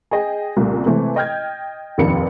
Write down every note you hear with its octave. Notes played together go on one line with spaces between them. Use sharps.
G#4 D#5 G5
C2 A#2 C#3 G3 A3
C3 E3 G#3 A3 C4
D#5 G5 F6 G6 G#6
F1 A#1 D#2 D#3 B4 C#7